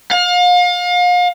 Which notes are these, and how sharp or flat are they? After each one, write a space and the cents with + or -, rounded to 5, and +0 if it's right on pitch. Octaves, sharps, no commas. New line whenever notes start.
F5 +35